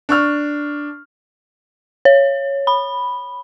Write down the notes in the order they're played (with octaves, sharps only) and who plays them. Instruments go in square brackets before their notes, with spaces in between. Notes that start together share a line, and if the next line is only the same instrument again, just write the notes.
[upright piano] D4 C#6 F6
[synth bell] C#5
B5